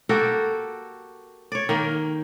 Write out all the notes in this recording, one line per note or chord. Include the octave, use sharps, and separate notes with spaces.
A#3 F#4 G4 A4
C#5 D5
D#3 A#3